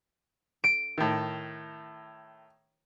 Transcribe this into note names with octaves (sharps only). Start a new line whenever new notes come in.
D7
A2 D#3